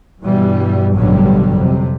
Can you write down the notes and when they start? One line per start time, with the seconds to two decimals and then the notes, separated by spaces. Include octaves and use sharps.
0.23 G2 B2 E3 G3
0.94 A1 G2 B2 D3 F#3 G3
1.58 F2 C3